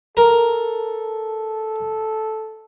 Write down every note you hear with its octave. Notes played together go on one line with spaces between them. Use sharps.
A4 A#4